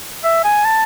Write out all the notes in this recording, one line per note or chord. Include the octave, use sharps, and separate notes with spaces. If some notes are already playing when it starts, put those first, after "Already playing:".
E5
G#5
A5